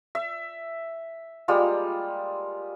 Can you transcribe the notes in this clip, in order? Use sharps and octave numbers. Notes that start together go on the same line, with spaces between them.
E5
G3 G#3 A#3 F4